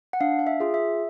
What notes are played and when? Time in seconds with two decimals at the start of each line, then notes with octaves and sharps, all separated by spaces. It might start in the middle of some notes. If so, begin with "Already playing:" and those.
0.13 F#5
0.21 D4 F5
0.39 F5
0.47 E5
0.60 F4 G#4
0.74 E5